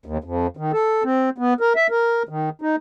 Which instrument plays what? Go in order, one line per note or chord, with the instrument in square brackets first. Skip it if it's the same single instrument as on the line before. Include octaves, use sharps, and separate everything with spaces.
[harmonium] D#2
F2
D#3
A4
C4
B3
A#4
E5
A#4
D#3
D#4